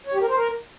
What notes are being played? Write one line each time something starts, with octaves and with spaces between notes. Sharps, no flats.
C#5
G4
A#4
C5
A#4